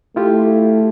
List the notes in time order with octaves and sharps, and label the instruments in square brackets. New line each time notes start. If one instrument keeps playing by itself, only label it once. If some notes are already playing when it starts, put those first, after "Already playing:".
[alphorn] A3 [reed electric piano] E4 F4 G4